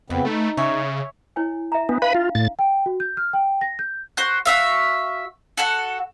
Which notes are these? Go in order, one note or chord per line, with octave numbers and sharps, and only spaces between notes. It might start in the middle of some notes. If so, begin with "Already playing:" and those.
F2 C#3 B3 C4 B4
A3 D#4
C#3 C#5 E5 G#5
E4 C#5 G#5
E5 A#5
B3 D4
B4 F5 B5
F4
A2 A6
G5
F#4
G6
F6
G5
A#6
G6
F#4 C5 F#6
F#4 E5 F5
F#4 A4 F#5